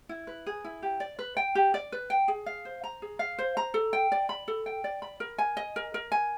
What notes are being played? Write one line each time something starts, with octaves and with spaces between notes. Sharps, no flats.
E4
B4
G#4
E4
G4
D5
B4
G5
G4
D5
B4
G5
G#4
F5
C5
A#5
G#4
F5
C5
A#5
A4
G5
D5
B5
A4
G5
D5
B5
A#4
G#5
D#5
A#4
A#4
G#5